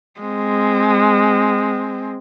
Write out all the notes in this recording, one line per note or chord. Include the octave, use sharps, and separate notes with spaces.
G#3 C4